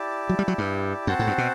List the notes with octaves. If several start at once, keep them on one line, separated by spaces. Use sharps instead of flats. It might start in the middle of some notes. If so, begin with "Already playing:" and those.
Already playing: E4 G4 D5 A5
F#3
G3
F#3
G2
F#2 C4 F#4 C5 F#5 A5
A2
G2
B2